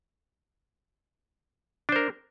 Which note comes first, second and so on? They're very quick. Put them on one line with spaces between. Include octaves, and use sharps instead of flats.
D4 C5 A#4